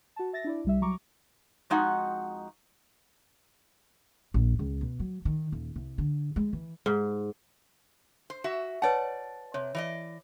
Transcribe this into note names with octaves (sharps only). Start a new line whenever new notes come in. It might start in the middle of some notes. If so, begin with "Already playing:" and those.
F#4 A5
E5 A6 A#6
D4 E4 D5
C2 G3 E5
F#3 A#5 C#6 D6
F2 G#3 D#4 F#4 F#5
A#1
C#2
B2
F#3
D#3
D#1
C2
D3
G#3
E3
G#2
C5
F#4 E5
B4 C#5 D5 F#5 A5
C3 C#5
E3 D5 D#5